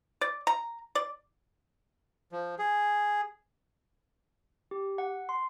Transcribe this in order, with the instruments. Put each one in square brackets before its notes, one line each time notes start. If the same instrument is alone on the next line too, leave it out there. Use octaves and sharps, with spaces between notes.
[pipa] D5
A#5
D5
[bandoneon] F3
G#4
[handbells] G4
F#5
C6